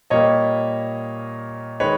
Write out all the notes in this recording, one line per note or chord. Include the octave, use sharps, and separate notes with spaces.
A#2 G3 A#3 C#5 D#5
D#3 G#3 B4 C#5